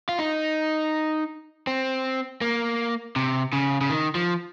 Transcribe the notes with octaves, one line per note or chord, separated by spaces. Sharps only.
F4
D#4
C4
A#3
C3
C#3
C#3
D#3
F3